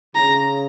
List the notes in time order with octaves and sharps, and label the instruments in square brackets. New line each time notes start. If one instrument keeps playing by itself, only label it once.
[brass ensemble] C#3 [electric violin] A#5